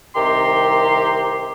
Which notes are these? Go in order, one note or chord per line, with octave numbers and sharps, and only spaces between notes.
C2 C3 D#3 G4 A#5 C6